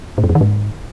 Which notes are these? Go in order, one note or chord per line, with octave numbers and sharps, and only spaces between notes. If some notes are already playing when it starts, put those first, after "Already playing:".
A2
F#2
F2
D#3
G#2